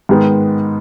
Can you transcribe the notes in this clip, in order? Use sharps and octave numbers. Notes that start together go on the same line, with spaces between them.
G#2 D#3 G#3 B3